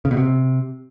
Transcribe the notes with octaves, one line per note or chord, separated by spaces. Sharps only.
C#3
B2
C3